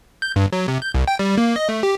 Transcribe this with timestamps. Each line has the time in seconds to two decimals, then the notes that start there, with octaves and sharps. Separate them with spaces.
0.22 G6
0.36 G2
0.52 F#3
0.68 C3
0.82 G6
0.94 C2
1.08 G5
1.19 G3
1.38 A#3
1.56 D#5
1.69 A3
1.83 G4